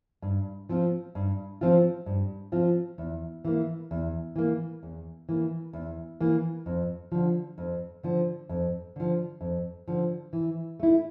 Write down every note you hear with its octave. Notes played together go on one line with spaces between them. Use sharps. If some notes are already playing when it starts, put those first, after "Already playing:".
G2
F3 C4 F4
G2
F3 C4 F4
G2
F3 C4 F4
E2
E3 A#3
E2
E3 A#3
E2
E3 A#3
E2
E3 A#3
F2
D3 F3
F2
D3 F3
F2
D3 F3
F2
D3 F3
E3
A3 E4